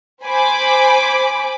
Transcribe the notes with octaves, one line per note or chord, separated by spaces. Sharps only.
C5 G#5 B5 D6